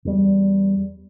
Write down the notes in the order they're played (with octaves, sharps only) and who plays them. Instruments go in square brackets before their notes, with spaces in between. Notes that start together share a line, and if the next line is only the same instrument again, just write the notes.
[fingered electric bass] E2 G3